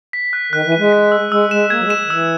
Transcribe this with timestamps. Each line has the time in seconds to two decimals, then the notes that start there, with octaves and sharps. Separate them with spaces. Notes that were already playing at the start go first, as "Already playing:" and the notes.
0.13 B6
0.33 F#6
0.52 D#3 F#6
0.65 E3
0.72 D#7
0.79 G#3
0.93 B6
1.12 E6
1.31 G#3 E6
1.51 G#3 E7
1.70 A#3 G#6
1.79 F#3
1.84 G#3
1.90 E7
2.05 D#3
2.10 E3 E6